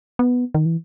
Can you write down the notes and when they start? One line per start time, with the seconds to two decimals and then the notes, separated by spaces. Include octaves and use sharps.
0.19 B3
0.55 D#3
0.66 E3